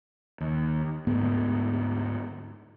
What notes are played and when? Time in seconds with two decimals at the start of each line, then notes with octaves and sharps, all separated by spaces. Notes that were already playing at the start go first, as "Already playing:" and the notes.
0.40 D#2
1.07 D2 G#2 B3